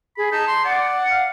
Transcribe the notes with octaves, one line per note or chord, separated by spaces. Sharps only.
G#4 B5
D#4 A5
C6
D5 F#5
F5